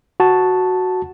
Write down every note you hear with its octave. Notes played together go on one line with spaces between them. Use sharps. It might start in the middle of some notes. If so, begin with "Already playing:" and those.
F#4 A5